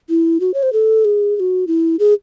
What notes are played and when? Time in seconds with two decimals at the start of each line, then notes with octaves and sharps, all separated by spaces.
0.09 E4
0.40 F#4
0.54 C#5
0.63 C5
0.73 A4
1.05 G#4
1.36 G#4
1.40 F#4
1.68 E4
1.99 G#4